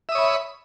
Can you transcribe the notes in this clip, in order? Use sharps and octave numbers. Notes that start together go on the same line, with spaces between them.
C#5 E5 B5 D#6